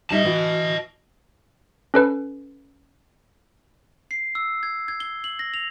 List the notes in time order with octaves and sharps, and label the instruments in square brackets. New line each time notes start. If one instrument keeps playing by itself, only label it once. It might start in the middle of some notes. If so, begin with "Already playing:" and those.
[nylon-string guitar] G3 D#4 E5 [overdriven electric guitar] D#5 A5
[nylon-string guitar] E3 F#4
[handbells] C#4 A4 B4
[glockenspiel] C7
E6
G#6
G#6
G7
F#7
A#6
F7